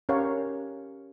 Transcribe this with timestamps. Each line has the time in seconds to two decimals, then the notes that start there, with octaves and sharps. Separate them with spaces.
0.09 C#4 G4 A#4 C#5 F5 F#5